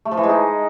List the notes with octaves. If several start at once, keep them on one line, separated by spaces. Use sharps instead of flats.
A3
F3
E3
G#3
D#4